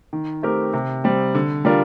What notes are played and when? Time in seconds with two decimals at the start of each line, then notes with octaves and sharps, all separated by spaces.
0.13 D#3
0.43 A3 C4 G4 A#4
0.73 C3
1.04 G3 C4
1.35 D3
1.65 G3 D4 F4 A#4